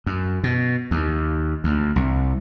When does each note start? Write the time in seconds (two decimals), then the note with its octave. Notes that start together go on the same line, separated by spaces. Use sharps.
0.06 F#2
0.44 B2
0.91 D#2
1.64 D2
1.96 C2